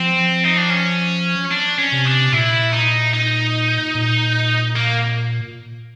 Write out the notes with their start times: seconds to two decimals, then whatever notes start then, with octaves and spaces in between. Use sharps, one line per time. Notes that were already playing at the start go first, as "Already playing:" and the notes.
Already playing: F3 C4
0.44 D#4
0.57 D4
0.70 C#4
1.52 D4
1.79 C#4
1.92 C3
2.05 D4
2.32 A#2 E4
2.73 D#4
3.13 D#4
3.95 A#2
4.76 A#3